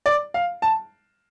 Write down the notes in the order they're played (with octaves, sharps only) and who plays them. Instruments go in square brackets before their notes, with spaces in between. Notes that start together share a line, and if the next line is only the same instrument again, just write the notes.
[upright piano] D5
F5
A5